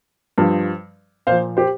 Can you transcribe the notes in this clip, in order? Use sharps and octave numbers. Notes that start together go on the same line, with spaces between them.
G2 F3
A#2 F3 C5 F5
G4 C5